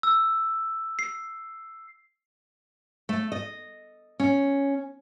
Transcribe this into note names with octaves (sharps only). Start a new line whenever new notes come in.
E6
C7
A3
D#5
C#4